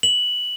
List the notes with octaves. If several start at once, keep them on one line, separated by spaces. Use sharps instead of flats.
F#7